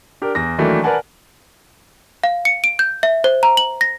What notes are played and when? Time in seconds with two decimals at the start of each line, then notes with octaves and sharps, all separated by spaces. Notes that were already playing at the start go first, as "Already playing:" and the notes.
0.22 D4 G4 A#4
0.35 E2 A#6
0.58 D#3 E3 F#3 A3 A#3 D4
0.83 A#4 B4 D5 F#5 G#5 A5
2.24 F5
2.45 C#7
2.64 D7
2.79 G6
3.03 E5
3.24 C5
3.43 A#5
3.57 F#7
3.81 A#6